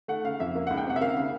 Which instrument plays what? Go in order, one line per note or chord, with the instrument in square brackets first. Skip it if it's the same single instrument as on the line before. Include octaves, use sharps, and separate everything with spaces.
[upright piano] A3 F#5
C#3 F5
F2 E5
A#3
C#2 F#5
G5
C3 F#5
E5
A#3 F5
C#3 F5